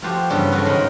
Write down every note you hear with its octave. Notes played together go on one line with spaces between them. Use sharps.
F3 A3 F#4 G4 C5
G2 C#3 E3 F#3 G3 B3
F#3 A3 A#3 C#4 F4 F#4
G#2 D#3 C#4 C5 D#5 B5